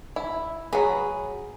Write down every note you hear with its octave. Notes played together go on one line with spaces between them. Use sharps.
E4
F#3 G#4 B4